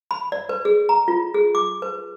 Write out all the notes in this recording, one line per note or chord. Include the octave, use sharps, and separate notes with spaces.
B5
D5
B4
G#4
A#5
F4
G#4
D6
B4